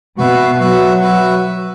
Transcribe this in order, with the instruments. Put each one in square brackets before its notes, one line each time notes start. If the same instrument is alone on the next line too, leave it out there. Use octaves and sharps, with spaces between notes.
[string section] B2 [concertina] F#4 B4 E5
[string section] F#3 [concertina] F#4 B4 E5
[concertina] F#4 B4 E5